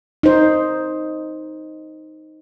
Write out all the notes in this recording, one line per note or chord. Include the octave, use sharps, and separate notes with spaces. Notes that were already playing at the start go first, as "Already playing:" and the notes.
D#4 C5